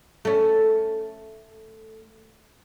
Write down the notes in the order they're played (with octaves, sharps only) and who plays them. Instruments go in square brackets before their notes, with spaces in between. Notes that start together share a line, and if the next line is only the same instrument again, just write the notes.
[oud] A3 C#4